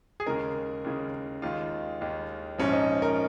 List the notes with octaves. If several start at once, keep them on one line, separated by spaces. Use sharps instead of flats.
G#4
D#2 C#3 G#3 A#4
D#2 C#3 G#3
D#2 D#3 G#3 F4
D#2 D#3 G#3
A#1 G#2 F3 C#4
D#4
A#4